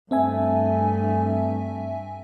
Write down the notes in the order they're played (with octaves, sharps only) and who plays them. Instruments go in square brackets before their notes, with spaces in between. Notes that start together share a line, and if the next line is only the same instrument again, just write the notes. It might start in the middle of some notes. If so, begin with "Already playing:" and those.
[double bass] G2 [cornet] A3 [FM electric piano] C4 E5 G#5